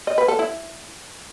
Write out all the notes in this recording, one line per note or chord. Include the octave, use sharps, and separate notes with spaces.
D#5
B4
A4
E4